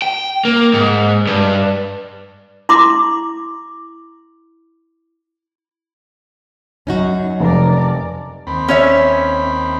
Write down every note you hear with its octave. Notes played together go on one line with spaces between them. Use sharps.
G5
A#3
G#2
G2
E4 C6 D6
F#2 C#4 D#4 F#4
F1 A#4 D5
D#2 C4 B5
C#4 C#5 E5